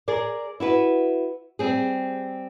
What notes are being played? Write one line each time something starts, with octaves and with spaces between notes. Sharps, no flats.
G#4 A#4 D5
E4 F#4 B4
G3 C4 G#4